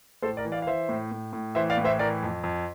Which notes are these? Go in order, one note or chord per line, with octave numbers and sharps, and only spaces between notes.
A2 A4 C5
A#4 D5
E3
D5 F5
F5
E3 C5 E5
A2
A2
A2
E3 C5 E5
D5 F5
A2
C5 E5
E3 A#4 D5
F2
F2